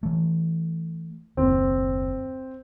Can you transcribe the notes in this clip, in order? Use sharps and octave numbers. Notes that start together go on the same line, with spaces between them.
E3 A3
F#1 D#2 C4